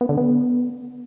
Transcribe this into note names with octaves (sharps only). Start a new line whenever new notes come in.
B3
D3
B3